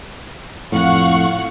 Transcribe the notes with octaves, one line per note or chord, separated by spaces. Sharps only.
F2 A2 F5 F#5 C#6